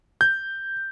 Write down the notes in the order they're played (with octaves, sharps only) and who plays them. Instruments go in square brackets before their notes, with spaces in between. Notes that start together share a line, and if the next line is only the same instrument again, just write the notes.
[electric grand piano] G6